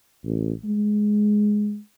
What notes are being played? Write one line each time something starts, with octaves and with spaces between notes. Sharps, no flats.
A1
G#3